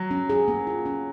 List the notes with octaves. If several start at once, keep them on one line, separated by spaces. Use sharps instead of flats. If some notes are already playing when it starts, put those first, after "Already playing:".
Already playing: F#3
C#4
G#4
A#3
F4
C#4